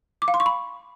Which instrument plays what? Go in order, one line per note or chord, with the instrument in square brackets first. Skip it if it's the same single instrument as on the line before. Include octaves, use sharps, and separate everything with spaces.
[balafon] D6
F5
C6
C#6
B5